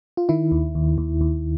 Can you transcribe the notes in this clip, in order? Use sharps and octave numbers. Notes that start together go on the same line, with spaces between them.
F4
D#3 E4
D#2
D#2
D#2
D#2